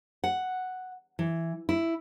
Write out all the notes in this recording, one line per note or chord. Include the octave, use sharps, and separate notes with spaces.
F#5
E3
E4